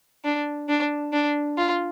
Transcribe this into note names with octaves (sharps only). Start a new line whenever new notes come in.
D4
D4
D4
F4